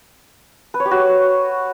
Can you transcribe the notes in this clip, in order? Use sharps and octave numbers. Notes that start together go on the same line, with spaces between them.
B4
C#5
G4
F#4